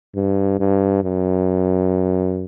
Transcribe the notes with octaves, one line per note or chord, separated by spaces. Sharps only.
G2
G2
F#2